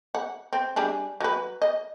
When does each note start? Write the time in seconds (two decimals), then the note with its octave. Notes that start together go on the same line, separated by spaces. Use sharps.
0.15 F#5
0.53 C4
0.76 G3 D4 G#4
1.20 F#3 B4
1.62 D#5